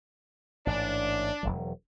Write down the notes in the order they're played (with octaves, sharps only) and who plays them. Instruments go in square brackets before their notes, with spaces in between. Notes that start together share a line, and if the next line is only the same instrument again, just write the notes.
[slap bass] A1 G#2 [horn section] D4
[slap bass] E1 B1 F#3